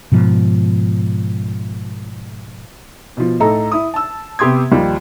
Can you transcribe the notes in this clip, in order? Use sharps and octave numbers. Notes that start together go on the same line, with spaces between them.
G#2 B2 F3
B2 F3
A2 D#4 A4 A#5
E4 D#6
A5 E6
C3 B3 G4 C6 D#6 G#6
D#2 D#3 F3 G3